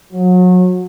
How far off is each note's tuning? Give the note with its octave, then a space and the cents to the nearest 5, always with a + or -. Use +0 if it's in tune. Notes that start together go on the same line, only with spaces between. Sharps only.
F#3 -30